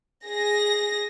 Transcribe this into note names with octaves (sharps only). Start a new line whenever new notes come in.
G#4 A#6